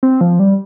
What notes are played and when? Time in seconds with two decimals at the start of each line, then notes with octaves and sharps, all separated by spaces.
0.03 C4
0.21 F3
0.39 G3